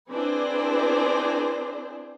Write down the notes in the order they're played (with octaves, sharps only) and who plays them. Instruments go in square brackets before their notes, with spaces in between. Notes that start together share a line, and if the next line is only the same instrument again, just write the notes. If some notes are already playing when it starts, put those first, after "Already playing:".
[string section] C4 D4 E4 G#4 B4 C5